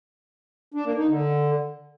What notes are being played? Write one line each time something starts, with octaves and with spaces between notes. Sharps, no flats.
D4
A#3
D#4
D3